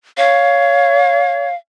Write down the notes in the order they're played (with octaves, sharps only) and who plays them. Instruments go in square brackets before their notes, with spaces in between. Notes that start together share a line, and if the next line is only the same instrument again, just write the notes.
[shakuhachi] C#5 [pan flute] F5